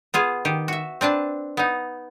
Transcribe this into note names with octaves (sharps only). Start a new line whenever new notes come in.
B3 F4 G#4
D#3 G4
F#4 E5
C4 D4 B4 A5
B3 D#4